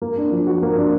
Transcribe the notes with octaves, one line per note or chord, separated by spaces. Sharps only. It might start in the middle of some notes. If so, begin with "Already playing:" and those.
A#3
D4
F3
F#4
A#3
D4